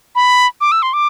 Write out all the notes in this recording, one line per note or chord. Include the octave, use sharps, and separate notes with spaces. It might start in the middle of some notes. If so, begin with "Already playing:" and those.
B5
D6
E6
C6
D6